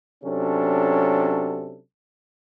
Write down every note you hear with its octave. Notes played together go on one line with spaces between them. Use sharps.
C3 F#3 C#4 D4 A4